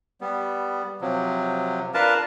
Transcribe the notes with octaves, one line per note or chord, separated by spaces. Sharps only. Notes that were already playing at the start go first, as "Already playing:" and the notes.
G3 B3
C3 F3 F#3
D4 F4 A#4 B4 A5